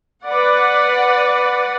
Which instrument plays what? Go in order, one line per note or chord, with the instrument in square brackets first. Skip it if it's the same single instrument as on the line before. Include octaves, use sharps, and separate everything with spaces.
[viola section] B4 D5 F#5